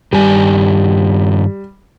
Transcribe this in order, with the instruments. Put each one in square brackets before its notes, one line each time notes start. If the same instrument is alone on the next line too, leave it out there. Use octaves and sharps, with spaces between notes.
[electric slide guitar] G2 D#3 G#5 [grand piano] G3